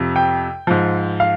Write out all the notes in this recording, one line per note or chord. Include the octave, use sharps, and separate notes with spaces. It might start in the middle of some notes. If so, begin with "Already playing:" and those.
Already playing: F2 C3 F3
G5
G#2 F3
F5